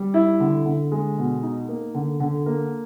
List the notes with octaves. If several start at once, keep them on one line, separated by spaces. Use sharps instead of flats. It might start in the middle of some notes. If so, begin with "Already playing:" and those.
Already playing: G3
E4
D3
D3
G#3
B2
D#4
A#3
D3
D3
A#3